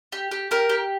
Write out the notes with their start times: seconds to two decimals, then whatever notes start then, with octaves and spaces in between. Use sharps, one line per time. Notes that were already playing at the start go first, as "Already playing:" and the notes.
0.12 G4
0.31 G4
0.51 G4 A#4
0.69 G4